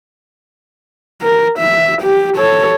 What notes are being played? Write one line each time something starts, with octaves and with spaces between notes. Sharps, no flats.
A#4
E5
G4
A4 C#5